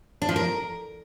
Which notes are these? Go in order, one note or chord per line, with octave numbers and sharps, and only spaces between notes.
D4
F3
A#4